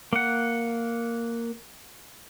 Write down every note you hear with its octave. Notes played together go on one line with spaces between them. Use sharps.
A#3 F#5